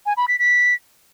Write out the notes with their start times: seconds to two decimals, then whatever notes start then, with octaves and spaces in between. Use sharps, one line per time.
0.06 G#5
0.17 B5
0.28 B6
0.39 B6